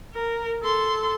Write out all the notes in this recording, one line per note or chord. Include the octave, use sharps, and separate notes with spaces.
A#4
A4 C6